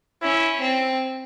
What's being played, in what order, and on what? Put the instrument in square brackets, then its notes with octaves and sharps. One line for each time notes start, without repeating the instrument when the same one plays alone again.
[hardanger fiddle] C#4 [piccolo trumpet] E4
[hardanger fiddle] C4